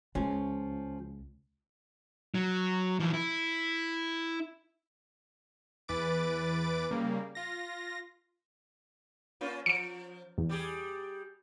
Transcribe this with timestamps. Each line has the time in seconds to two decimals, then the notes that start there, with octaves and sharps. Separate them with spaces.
0.15 C#2 F3 C#4
2.34 F#3
3.00 E3 F3
3.13 E4
5.88 E2 E3 B4 D6 A6 D7
6.91 C#3 G3 A#3
7.35 F4 A#6
9.41 A#3 C#4 F4
9.66 F3 C#7 D7
10.38 E2
10.49 G3 G4 G#4